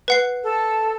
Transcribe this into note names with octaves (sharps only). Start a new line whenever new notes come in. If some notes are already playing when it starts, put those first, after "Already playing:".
B4 F#5 C7
A4